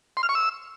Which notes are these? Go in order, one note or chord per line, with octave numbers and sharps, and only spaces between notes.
C6
F6
C#6
E6